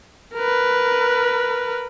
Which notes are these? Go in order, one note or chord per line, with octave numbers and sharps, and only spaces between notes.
A#4 B4